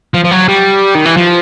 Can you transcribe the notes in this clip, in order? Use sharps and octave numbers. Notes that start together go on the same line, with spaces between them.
F3
F3
F#3
G3
D#3
E3
F3